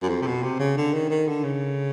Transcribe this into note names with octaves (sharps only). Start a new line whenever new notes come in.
F#2
F2
C3
B2
C3
C#3
D3
D#3
D#3
D3
C#3